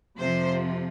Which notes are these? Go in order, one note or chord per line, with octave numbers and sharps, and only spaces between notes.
F2 C3 F3 C5